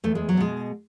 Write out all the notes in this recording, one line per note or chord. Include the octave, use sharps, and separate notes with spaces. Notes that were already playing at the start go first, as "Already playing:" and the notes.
E2 A3
G#3
F#3
B2 G#3